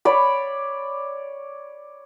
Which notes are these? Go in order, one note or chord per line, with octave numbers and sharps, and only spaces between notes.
C#5 D5 B5